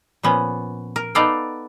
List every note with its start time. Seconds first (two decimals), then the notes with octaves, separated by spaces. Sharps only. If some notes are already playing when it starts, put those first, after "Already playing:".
0.23 A#2 F3 B3 C#4
0.96 A#4
1.15 B3 D#4 A4 D5 F5 G5